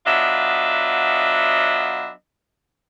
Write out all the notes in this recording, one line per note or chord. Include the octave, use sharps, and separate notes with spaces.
F#3 B3 D4 F4 D#5 E5